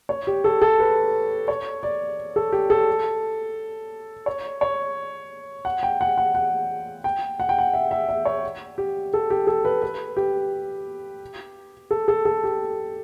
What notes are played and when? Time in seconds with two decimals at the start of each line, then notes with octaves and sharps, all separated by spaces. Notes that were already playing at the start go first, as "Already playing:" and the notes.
0.09 C#5
0.27 G4
0.44 A4
0.62 A4
0.80 B4
1.48 C#5
1.83 D5
2.36 A4
2.52 G4
2.70 A4
4.26 C#5
4.61 C#5
5.65 F#5
5.83 G5
6.01 F#5
6.18 F#5
6.35 F#5
7.04 G5
7.40 F#5
7.49 G5
7.59 F#5
7.73 E5
7.91 E5
8.09 E5
8.25 C#5
8.78 G4
9.14 A4
9.30 G4
9.47 A4
9.65 B4
9.82 B4
10.17 G4
11.91 A4
12.08 A4
12.25 A4
12.44 G4